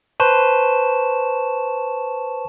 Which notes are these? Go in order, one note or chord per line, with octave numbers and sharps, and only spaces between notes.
B4 C5 A5 C#6 E7